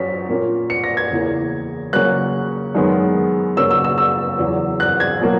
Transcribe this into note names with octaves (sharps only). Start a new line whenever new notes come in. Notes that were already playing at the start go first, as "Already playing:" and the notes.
Already playing: F#3 C#4 B6
A#2 A#3 C#4
C#7
A#6
G#6
E2 C#3 E3 A#3
C#3 F#3 A#3 C#4 F#6
F#2 D#3 G#3 B3
C#3 F#3 A#3 C#4 E6
E6
E6
E6
E2 C#3 F#3
F#6
G#6
B2 F#3 A#3